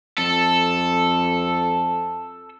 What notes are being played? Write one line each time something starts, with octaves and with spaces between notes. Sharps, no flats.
F2 A4